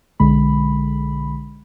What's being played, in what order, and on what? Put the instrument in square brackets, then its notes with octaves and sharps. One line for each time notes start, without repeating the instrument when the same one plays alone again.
[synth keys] B1 D3 G#3 B5